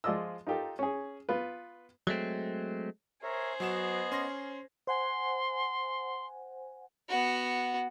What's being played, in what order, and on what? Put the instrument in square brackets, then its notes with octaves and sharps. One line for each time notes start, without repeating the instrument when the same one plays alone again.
[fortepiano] F3 G#3 F4 D5 D#5 E6
D#4 F4 G4 A4 A#4
C#4 G#4
B3 F4 B4
[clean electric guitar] F#3 G#3 A3 C4
[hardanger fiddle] G#4 C5 [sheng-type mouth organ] A#4 C#5 E5
[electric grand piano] F#3 F#4 E7 [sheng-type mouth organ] B3 D#5
[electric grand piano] C#4 C6 A#6
[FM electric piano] C5 F#5 G#5 [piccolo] C6
[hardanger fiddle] B3 F#4